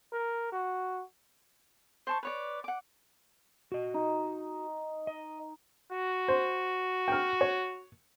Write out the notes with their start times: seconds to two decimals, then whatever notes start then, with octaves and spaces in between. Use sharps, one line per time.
0.13 A#4
0.52 F#4
2.07 C5 A5 C#6
2.23 B4 C#5 D5
2.64 F#5 D6
3.72 F#4 D#5
3.94 D#4
5.07 D#5
5.92 F#4
6.28 C5
7.08 G5 F6
7.41 C#5